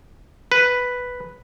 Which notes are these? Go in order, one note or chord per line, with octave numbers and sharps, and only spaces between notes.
B4